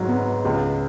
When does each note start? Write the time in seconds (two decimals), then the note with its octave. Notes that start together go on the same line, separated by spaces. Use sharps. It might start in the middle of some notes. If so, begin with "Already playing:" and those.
Already playing: G#1 G#2 F#3
0.08 B3
0.45 C#2